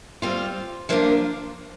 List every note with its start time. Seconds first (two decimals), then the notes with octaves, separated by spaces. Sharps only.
0.22 G3 C4 F4
0.89 F3 A#3 D4 F4 A#4